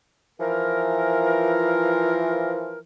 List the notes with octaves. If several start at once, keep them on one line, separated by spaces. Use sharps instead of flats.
E3 F3 A#4